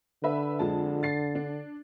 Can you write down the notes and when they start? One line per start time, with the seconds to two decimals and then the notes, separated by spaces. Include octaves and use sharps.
0.24 D3 B4 E5
0.59 F2 G#3 A5
1.03 A6 C7
1.35 D4